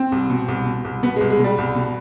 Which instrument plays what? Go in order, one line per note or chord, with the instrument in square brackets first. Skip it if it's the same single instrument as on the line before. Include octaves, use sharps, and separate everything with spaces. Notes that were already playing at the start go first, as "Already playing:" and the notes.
Already playing: [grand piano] C4
C2
B2
C2
B2
C2
B2 B3
C2 G#3
G#3
B2 G3
C2
B2